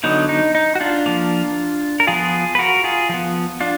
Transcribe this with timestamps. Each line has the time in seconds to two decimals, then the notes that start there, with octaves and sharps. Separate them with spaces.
0.04 D3 F#3 B3 D#4
0.29 D#4
0.55 D#4
0.75 F#4
0.80 D4 F4
1.06 F3 A#3
2.00 A#4
2.07 F3 B3 F4 G#4
2.55 B4
2.59 F#4 A#4
2.84 F4 G#4
3.09 F3 B3
3.60 D4 F4